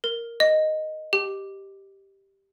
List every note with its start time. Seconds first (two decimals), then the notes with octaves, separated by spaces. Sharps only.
0.04 A#4
0.40 D#5
1.13 G4